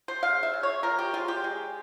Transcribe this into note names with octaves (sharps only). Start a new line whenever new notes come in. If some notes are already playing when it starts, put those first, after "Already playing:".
C5
C#3 F5
E5
C#3
C#5
F3 A#4
G4
G#3 F4
G4
G#3